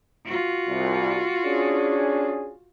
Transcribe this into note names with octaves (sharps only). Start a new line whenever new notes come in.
F4 F#4
C2
C#4 D4 G#4